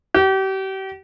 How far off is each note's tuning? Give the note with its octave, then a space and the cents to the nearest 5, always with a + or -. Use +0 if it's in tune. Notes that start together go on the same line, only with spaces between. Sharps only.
G4 -35